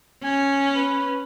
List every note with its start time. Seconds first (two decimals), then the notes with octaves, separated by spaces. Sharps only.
0.24 C#4 G#5
0.76 B4